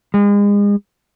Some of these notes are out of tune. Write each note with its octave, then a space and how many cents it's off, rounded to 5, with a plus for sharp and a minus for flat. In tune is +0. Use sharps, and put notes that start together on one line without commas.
G#3 -35